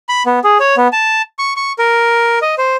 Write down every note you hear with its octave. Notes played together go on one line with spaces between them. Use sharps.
B5
B3
G#4
C#5
B3
A5
C#6
C#6
A#4
D#5
C5